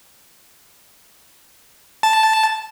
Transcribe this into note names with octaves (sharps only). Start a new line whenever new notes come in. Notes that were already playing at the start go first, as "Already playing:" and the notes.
A5